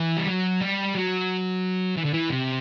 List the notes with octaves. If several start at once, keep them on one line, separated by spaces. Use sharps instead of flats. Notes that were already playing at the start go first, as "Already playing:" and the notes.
Already playing: E3
G3
F#3
G3
F#3
E3
D3
E3
C3